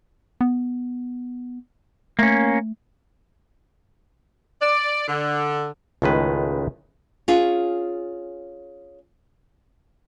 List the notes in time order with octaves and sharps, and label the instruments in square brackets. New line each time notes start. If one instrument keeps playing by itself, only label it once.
[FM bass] B3
[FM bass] A3 [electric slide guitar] A#3 C#4
[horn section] D5
D3
[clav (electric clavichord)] C#2 A2 D#3 G#3 B4
[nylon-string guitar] C#4 F4 G#4